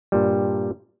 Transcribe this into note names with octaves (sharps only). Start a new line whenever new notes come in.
G2 A#2 G3